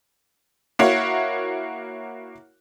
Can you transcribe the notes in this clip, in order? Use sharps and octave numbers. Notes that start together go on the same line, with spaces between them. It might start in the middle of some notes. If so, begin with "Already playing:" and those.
A#3 E4 F#4 C#5